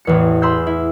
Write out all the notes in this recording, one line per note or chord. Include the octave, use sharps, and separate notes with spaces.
A1 E2 C#7
G#4 B5 C6 E6 G6
E4